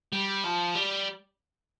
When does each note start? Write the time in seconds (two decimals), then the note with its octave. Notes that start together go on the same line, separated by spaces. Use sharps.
0.12 G3
0.44 F3
0.75 G3